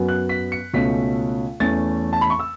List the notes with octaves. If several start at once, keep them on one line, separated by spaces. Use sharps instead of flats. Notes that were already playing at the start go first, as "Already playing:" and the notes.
Already playing: F#2 F#3 B3
F#6
B6
C#7
C#2 B2 A3 C#4 B6
E2 E3 A3 C#4 A6
A5
B5
C#6
E6